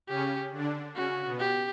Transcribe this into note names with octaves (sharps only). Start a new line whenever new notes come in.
C#3 C#4 G4
D3 D4
C#3 C#4 F#4
B2 B3
G4